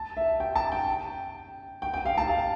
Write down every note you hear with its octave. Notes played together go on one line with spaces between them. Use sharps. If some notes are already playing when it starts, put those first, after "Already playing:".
Already playing: A5
E5
G5
A5
G5
G5
G5
F5
A5
F5